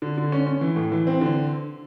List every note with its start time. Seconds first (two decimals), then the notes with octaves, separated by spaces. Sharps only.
0.02 D3
0.18 D3
0.32 C#4
0.47 C#4
0.61 E3
0.76 A2
0.92 E3
1.07 C4
1.21 D3